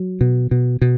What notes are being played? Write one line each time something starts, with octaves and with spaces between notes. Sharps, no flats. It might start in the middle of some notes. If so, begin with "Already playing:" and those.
Already playing: F#3
B2
B2
B2